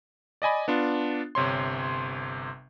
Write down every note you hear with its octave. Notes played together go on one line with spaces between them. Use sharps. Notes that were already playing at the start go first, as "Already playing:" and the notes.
D5 D#5 G#5 B5
B3 D4 F4
G1 C3 C#5 C6